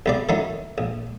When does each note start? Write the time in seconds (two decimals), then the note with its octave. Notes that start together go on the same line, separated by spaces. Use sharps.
0.06 B1 G3 D5
0.29 D#3 F#3 A3 C#4 D#4 E4
0.78 A#1